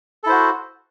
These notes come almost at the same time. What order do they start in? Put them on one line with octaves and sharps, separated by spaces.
A4 E4 C5 F#4